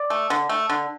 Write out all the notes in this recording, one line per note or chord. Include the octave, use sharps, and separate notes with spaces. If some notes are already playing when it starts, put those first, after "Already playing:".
Already playing: D5
A3
D3
A3
D3